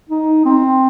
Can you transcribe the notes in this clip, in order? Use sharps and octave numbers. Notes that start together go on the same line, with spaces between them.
D#4
C4